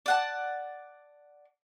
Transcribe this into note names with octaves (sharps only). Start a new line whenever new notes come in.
D5 F#5 A5